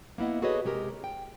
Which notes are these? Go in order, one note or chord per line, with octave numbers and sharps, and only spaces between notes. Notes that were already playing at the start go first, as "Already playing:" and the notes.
A#3 B3 E4 D#5 F#5
F#4 G#4 A4 B4 C#5 D#5
C3 G#3 G4 A#4
G5